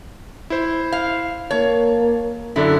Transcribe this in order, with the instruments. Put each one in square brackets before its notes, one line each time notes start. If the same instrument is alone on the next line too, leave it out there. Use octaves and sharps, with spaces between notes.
[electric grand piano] E4 C5
[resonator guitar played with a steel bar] F5
[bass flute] A#3 [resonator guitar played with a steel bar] C#5 [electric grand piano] A5
[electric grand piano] F#2 D3 D4 [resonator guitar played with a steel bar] E4 [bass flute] A4